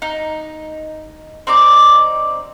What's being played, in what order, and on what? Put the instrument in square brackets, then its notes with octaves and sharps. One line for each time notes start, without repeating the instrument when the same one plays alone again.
[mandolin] D#4
C4 D#4 D5 D6